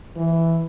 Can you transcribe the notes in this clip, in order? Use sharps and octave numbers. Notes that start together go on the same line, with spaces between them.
E3